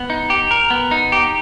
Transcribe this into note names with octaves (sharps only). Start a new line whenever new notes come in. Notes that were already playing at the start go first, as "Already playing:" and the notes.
Already playing: B3
D#4
G4
A#4
B3
D#4
G4